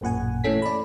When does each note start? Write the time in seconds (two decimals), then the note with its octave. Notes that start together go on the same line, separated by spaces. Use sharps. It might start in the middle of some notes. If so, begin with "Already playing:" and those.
0.01 A1 F#2 A#2 F#5 G#5
0.44 E3 A3 C#4 A4 B6
0.62 D5 B5